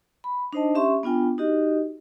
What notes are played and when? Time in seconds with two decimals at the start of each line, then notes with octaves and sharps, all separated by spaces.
0.24 B5
0.53 D4 D#4 C5 D#5 A5
0.75 C#4 G4 E5 C6 C#6
1.03 B3 D4 F4 G5 G#5
1.38 D#4 F#4 G4 D#5